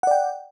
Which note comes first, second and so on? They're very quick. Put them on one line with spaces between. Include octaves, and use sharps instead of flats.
F#5 D5 G5